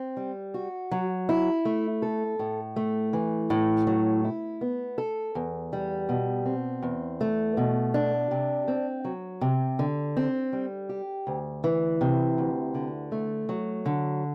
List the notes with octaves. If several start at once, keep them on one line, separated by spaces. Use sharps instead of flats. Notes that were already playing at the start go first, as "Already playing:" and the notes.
Already playing: C4
G3
F#4
F#3
E4
A3
A4
A2
A3
E3
A2
F#3
E4
B3
A4
E2
G3
B2
C4
E2
A3
B2
D4
C3
C4
F#3
C3
D3
C4
G3
G4
D2
E3
C3
D2
D3
A3
F#3
D3